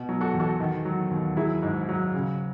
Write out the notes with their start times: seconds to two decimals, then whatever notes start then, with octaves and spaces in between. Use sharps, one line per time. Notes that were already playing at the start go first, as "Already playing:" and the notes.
Already playing: B2
0.09 F#3
0.21 F#4 A4
0.34 E2
0.40 F#4 A4
0.60 D#3
0.85 F#3
1.11 D#2
1.37 F#3 E4 G#4
1.63 G#2
1.89 F#3
2.14 C#3